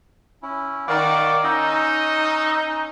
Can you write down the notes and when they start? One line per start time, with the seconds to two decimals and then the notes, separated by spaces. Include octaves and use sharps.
0.42 C#4 E4
0.88 D#3 D5 F5 F#5 C#6
1.44 C#4 D#4 E6